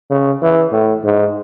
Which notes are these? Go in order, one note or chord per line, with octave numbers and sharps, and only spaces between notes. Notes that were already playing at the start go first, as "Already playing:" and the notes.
C#3
E3
A2
G#2